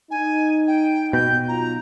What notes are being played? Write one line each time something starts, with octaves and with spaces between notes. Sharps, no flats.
D#4 G#5
G5
B2 G6
F#3 D#4 F4 A#5